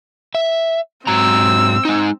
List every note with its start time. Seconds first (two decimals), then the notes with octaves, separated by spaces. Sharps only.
0.35 E5
1.07 G#2 F#3 C4 A#5 E6
1.85 G#3 D#4